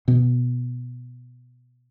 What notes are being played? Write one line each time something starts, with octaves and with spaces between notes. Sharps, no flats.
B2 B3